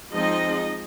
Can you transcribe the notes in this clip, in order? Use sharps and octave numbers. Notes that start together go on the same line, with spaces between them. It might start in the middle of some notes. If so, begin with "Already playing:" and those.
F3 G#3 C4 D#4 D#5